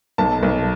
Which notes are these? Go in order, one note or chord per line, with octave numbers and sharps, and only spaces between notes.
B1 A5
B1